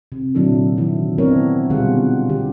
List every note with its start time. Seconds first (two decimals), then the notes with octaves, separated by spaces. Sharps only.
0.12 C3
0.35 A#2 D3 F#3 D4 E4 A4
0.77 D#3 E3 E4
1.18 B3 C4 D4 E4 A#4 C#5
1.70 B2 D3 G3 F4 G#4 F#5
2.29 D3 G4